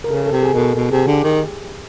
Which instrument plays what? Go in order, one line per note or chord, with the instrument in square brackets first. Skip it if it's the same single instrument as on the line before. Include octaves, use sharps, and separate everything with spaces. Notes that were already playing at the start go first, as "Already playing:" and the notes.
[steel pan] A#4
[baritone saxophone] C#3 [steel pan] A4
[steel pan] A4
[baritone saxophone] C3
[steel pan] G#4
[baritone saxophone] B2 [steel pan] A#4
[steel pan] A4
[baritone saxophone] B2 [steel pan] A4
[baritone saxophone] C3 [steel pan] G#4
[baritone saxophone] D3 [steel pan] G4
[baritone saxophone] D#3